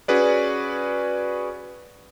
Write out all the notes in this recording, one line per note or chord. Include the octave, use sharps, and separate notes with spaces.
C#4 F#4 G#4 B4 D5